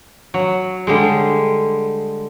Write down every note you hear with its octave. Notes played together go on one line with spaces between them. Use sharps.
F#3
D3 G3 G#3